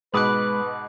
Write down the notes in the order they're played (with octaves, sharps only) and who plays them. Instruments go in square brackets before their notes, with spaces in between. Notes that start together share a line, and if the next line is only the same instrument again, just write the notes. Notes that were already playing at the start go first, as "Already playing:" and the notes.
[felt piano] G#2 B2 D#6 [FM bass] G#3 [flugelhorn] B4 [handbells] B5 D6 F#6